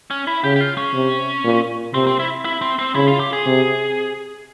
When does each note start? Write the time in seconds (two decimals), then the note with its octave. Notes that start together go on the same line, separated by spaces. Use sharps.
0.11 C#4
0.27 E4
0.44 C#3 G4
0.56 G4
0.61 F4
0.77 C#4
0.94 C3
1.44 A#2
1.94 C3 C4
2.07 C4
2.19 E4
2.45 E4
2.61 C4
2.79 C4
2.95 C#3 E4
3.07 F4
3.20 G4
3.33 G#4
3.46 C3